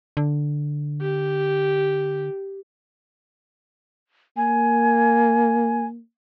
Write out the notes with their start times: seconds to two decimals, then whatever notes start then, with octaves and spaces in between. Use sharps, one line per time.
0.17 D3
1.01 G4
4.37 A#3 G#5